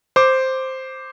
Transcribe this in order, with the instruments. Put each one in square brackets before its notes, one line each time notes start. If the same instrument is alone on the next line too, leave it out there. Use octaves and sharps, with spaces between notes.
[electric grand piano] C5 D6